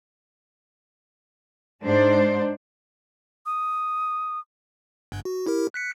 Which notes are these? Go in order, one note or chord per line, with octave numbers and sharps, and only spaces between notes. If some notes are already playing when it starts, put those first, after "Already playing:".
G#2 D4 C5
D#6
G1 G2
F#4
E4 G4 A#4
F#6 B6 C#7